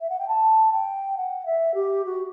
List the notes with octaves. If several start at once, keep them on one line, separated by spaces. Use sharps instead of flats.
E5
F#5
G5
A5
G5
F#5
E5
G4
F#4